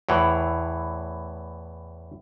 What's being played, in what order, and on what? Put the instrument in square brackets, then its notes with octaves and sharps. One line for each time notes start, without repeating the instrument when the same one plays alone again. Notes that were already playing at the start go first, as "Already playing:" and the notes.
[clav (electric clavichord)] E2 A2 E3